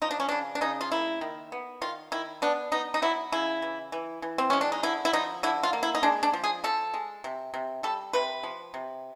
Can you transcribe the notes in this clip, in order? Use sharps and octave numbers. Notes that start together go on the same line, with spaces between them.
F3 D#4
D4
C#4
C#3 D4
D4
C#3 D#4
F4
A#3 E4
D#3
B3
D#3 F4
D#3 E4
B3 D4
B3 D#4
D#4
F#3 E4
C#3 E4
E3
E3
E3
C4
G#3 C#4
D4
D#4
D3 E4
E4
F3 D#4
D3 E4
F4
A#3
E4
D#4
G#3 D4
D4
F3
G#4
F3 A4
G#3
C3
C3
G3 A4
C3 B4
F3
C3